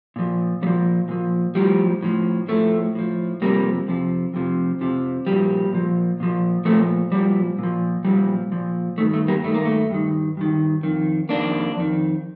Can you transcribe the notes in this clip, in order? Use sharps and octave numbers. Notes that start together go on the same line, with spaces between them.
A#2 F3
A#2 F3 G3
A#2 F3
A2 F3 G3
A2 F3
A2 F3 A3
A2 F3
F2 C3 F3 G3 A#3
F2 C3 F3
F2 C3 F3
F2 C3 F3
A#2 F3 G3
A#2 F3
A#2 F3
A#2 F3 A3
A#2 F3 G3
A#2 F3
A#2 F3 G3
A#2 F3
G2 D#3 A3
A3
G3 A#3
G2 D#3 A3
A#3
A3
G2 D#3
G2 D#3
F2 D#3
F2 D#3 A#3 D4
F2 D#3